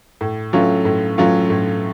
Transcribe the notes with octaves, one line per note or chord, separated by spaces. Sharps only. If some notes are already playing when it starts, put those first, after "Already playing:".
A2
F#3 A3 C#4 F4
A2
F#3 A3 C#4 F4
A2